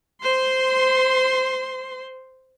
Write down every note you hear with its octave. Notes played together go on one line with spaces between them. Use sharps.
C5 C6